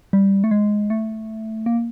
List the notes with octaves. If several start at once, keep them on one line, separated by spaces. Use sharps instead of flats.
G3
A3
G#3
A3
A#3